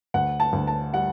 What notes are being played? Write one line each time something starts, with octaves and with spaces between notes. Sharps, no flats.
D2 F#5
A5
D2
A5
G3 F#5